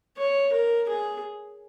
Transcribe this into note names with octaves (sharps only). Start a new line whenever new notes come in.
C#5
A#4
G#4